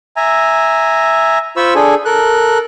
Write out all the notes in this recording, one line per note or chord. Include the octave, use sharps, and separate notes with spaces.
E5 G#5 A#5
F4 C5 B5 C#6 E6
D4 G#4 A4 G#5
A4 A#4 F#6